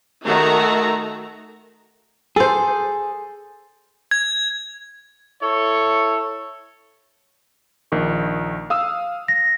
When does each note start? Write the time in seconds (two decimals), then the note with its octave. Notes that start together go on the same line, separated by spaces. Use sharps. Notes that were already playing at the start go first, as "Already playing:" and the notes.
0.23 D#3 A3 F#4 A#5
2.36 G#4 A4 C5
4.11 G#6
5.42 E4 A4 C#5
7.92 A#1 D#3 C#6
8.70 F5 D#6 E6
9.28 A#6